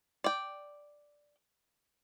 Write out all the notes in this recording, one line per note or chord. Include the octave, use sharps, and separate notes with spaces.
D5 G5